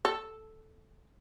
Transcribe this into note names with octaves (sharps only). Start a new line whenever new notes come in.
A4